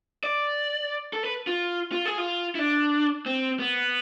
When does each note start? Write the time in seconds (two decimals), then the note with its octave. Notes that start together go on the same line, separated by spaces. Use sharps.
0.24 D5
1.13 A4
1.24 B4
1.47 F4
1.92 F4
2.05 G#4
2.18 F4
2.55 E4
2.59 D4
3.26 C4
3.60 B3